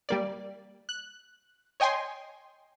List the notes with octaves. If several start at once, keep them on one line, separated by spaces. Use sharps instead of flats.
G3 A#3 D5
F#6
C#5 D#5 G5 G#5 C6